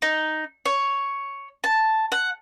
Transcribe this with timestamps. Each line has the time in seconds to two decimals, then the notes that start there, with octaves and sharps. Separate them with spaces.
0.02 D#4
0.65 C#5
1.64 A5
2.12 F#5